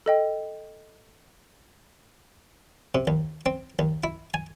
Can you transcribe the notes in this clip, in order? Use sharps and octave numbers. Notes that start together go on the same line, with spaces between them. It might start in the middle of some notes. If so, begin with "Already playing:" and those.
A4 D#5 G5
C3
D#2
C4
D#2
E4
G#5